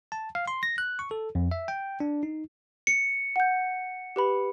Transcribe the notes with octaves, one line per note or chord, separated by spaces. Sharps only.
A5
F5
C6
A#6
F#6
C#6
A4
F2
E5
G5
D4
D#4
C#7
F#5 G6
G4 B4 B5